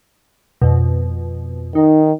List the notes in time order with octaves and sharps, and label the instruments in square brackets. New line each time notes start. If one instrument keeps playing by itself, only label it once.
[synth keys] F2 B2
[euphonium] D#3 [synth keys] D#4